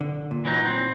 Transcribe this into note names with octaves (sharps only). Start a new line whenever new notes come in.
D3
A#2
E3 F#3 D#4
C4